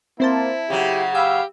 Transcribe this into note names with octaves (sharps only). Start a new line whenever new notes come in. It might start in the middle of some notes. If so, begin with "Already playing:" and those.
A#3 C4 E4 C5 A5
C#3 F#3 G4
G4 F5 B5 E6